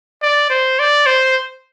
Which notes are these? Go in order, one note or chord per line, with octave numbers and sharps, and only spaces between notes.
D5
C5
D5
C5